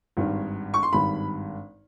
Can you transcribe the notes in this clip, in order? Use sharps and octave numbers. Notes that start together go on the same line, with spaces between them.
G#1 G2 D#3
C#6
C6
G#1 G2 D#3 B5